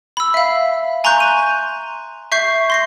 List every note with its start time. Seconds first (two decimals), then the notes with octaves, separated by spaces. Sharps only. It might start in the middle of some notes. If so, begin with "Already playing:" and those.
0.17 B5 E6
0.34 E5 F5
1.04 G#5 A#5 C6 C#6 F#6 G6
1.20 D#7
2.32 E5 C#6 G6 C7
2.70 C6 A#6 C7